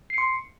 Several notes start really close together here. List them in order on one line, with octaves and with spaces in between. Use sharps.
C7 C#7 C6